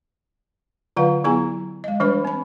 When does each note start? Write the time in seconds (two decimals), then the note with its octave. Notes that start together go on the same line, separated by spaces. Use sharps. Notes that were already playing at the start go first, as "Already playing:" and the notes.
0.96 D3 F#3 F4 B4 F5 F#5
1.24 F#3 B3 E4 G#4 G#5 A#5
1.84 G#3 D#5
2.00 E3 G3 D4 B4 C#5 B5
2.25 C4 B5